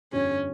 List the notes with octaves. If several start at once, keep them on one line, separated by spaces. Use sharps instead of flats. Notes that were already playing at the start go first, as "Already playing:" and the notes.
G1 F2 D3 G3 C#4